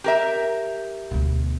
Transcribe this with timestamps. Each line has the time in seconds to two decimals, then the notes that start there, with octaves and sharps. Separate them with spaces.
0.04 G4 A#4 E5
1.11 D2 B2